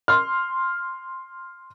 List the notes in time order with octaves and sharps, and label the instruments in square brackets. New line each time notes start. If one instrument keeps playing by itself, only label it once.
[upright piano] C6 F6